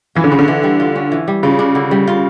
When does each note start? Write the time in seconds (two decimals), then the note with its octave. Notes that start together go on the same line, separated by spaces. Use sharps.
0.15 E3 F4
0.24 D3
0.31 C#3 C#4
0.39 D3
0.48 E3
0.63 G3
0.80 F4
0.96 C#4
1.12 E3
1.28 G3
1.43 C#3 F4
1.59 D4
1.75 D3
1.91 G3
2.07 F4